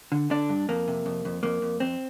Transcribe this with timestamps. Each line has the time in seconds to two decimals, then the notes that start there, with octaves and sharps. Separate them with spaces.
0.12 D3
0.30 D3 D4
0.49 G2
0.69 F2 A#3
0.88 C3
1.06 F2
1.25 F2
1.43 F2 A#3
1.62 F2
1.80 F2 C4